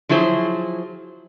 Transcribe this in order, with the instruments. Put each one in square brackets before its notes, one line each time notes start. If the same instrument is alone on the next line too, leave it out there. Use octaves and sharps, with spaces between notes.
[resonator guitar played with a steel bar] F3 F#3 E4 G#4 C5